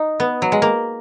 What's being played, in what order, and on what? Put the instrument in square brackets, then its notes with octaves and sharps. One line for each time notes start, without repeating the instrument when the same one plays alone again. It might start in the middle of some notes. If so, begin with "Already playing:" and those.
Already playing: [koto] D#4
B3
F#3
G#3
A#3